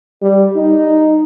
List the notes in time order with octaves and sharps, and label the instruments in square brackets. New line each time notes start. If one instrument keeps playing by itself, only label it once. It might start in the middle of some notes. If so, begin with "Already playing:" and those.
[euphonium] G3
D#4